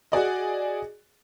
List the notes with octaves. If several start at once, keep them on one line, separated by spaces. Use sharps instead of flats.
F#4 G#4 D5 D#5